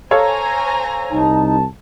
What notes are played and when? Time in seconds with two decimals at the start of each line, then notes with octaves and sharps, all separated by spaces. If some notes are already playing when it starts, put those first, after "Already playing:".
0.11 A4 C5 C#5 F5 G#5 A#5
1.11 C2 D#4 A5